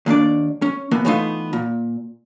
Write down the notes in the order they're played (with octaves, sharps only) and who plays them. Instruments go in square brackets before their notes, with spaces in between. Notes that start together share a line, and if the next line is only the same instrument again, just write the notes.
[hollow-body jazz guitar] D#2 A#3 D4 D5
C#4
E3 A#3 B3
E3 G3 A3 B3 D#4 F4
A#2